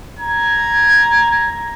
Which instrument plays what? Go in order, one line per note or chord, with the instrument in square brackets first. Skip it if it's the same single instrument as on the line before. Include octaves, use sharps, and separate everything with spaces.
[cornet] A#5 [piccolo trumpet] G#6